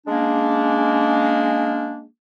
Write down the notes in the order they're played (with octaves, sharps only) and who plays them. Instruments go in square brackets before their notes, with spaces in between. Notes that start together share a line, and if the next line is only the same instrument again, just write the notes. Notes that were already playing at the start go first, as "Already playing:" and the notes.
[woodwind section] G#3 A#3 C#4 D4